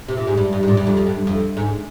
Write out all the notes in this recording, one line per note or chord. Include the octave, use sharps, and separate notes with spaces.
C3
A#2
G#2
G2
G2
G#2
A#2
G2
F2
F2
G2
F2
G#2